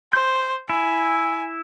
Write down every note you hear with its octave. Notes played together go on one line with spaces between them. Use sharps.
C5 G6
E4 G#5